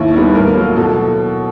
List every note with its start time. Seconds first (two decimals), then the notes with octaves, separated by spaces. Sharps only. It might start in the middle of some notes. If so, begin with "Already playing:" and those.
Already playing: D#2 E4
0.14 D#3 G3 B3
0.35 A2 A#4
0.55 F#3 A#3
0.76 B2 A4